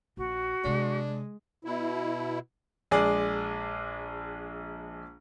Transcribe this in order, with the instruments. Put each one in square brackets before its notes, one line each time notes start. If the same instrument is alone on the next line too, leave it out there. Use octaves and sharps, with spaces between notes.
[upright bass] A#1 [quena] F#4
[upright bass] C3 B3 [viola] G#3 [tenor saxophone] D4
[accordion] B2 E4
[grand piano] A#1 G#3 G#4 D5